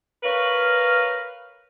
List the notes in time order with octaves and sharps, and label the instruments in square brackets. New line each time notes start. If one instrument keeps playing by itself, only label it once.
[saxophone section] A#4 B4 C#5 F5